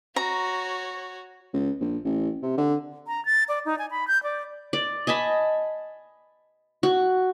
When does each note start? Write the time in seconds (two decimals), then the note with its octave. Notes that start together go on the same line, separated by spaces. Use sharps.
0.16 F#4 C#5 A#5
1.53 C#2
1.81 A#1
2.04 A1
2.43 C3
2.57 D3
3.07 A#5
3.25 A6
3.48 D5
3.65 D#4
3.79 G#5
3.91 B5
4.08 G6
4.23 D5
4.73 D5
5.07 D#5 G#5 A5 B5
6.83 F#4